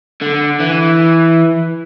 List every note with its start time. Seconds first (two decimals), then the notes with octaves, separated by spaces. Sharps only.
0.21 D3
0.60 E3